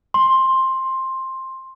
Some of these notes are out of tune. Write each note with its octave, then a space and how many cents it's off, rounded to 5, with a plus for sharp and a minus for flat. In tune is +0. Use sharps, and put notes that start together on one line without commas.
C6 +10